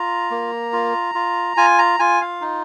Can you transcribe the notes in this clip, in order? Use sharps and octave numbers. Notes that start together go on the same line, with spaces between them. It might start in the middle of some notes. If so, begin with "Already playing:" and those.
Already playing: F4 A#5
A#3
F4
F4
F4 G#5
A#5
F4 G#5
F5
D#4